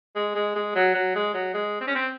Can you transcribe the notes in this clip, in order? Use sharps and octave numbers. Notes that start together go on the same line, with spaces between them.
G#3
G#3
G#3
F#3
F#3
G#3
F#3
G#3
C4
C#4
C4